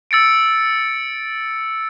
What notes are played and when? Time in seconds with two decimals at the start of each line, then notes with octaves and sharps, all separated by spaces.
0.11 E6 A6 C#7 D7